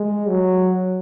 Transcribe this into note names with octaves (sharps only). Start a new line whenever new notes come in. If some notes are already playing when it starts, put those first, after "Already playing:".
Already playing: G#3
F#3